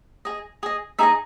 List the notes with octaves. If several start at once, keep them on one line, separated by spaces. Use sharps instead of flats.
G#4 D#5
G#4 D#5
D#4 G#4 D#5 E5